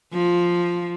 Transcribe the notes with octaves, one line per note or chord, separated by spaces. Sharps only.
F3